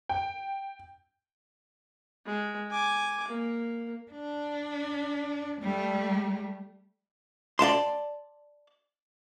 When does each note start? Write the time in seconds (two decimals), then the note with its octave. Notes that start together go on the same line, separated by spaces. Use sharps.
0.09 G5
2.25 G#3
2.71 G#5 D6
3.28 A#3
4.11 D4
5.61 G3 A3
7.59 D5 F5 A5 C6